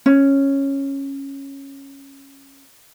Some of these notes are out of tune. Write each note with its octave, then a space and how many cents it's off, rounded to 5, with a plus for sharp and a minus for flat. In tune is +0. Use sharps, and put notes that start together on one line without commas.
C#4 -10